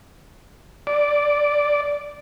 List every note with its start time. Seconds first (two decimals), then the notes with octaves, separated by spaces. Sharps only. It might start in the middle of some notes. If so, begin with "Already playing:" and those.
0.87 D5